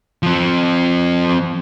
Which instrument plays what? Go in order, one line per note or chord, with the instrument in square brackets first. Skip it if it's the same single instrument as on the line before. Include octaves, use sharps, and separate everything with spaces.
[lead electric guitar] F3 C4